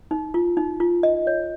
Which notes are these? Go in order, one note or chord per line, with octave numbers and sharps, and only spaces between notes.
D#4
F4
D#4
F4
D#5
C#5